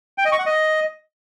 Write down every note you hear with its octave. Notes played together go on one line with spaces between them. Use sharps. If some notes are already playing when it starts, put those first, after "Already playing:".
G5
D#5
C#6
F#5
D#5